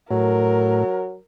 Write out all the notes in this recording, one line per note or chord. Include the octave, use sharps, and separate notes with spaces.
A2 F#3 A#4